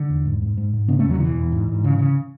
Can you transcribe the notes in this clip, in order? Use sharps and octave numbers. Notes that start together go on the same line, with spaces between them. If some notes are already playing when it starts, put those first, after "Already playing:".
Already playing: D3
E2
G#2
G#2
G#2
G#2
C#3 B3 D4
A3 C#4
E2
D3 F#3
B2 E3
E2
G#2
G#2
C#3
C#3